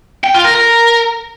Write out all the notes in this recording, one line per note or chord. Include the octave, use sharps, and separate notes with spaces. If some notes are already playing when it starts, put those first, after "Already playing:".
G5
F4
A#4
A#4